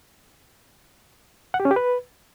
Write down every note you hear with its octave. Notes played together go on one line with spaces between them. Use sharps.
F#5
G4
C#4
G4
B4